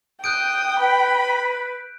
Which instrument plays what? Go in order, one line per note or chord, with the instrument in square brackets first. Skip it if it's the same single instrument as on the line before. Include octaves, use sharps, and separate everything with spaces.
[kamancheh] G5 [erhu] D#6 [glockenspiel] F#6 G6 D7
[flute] B4 [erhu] B5